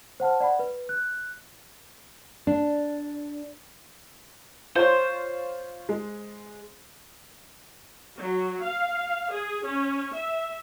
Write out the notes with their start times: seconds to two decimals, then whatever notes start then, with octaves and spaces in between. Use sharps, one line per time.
0.20 C5 F#5 A5 F6
0.40 D5 F#5 B5
0.59 B4
0.89 F#6
2.47 D4
4.75 F4 C5 C#5
5.89 G#3
8.16 F#3
8.62 F5
9.31 G#4
9.64 C#4
10.13 E5